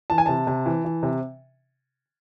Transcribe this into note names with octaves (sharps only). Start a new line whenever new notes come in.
E3 A5
G#5
C3 A5
C3
E3
E3
C3